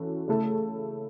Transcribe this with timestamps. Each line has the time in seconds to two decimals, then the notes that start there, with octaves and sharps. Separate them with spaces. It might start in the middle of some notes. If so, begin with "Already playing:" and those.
Already playing: E3 C#4 F#4 A4
0.28 C#3 A3 E4 A4